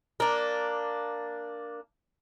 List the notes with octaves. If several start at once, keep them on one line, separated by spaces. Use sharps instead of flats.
A#3 D4